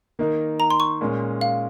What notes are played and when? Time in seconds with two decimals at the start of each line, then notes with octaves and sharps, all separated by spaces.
0.19 D#3 A#3 D#4 A#4
0.60 A#5
0.70 C6
0.80 C#6
1.01 A#2 G#3 C#4
1.41 F5